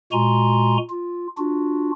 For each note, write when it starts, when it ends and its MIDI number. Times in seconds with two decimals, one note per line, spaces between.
0.12 0.77 46
0.12 0.77 56
0.12 0.77 66
0.12 0.77 80
0.12 0.77 82
0.12 0.77 84
0.90 1.27 65
1.38 1.91 62
1.38 1.91 65
1.38 1.91 66